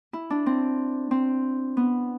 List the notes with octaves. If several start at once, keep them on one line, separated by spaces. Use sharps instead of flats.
E4
D4
C4
C4
B3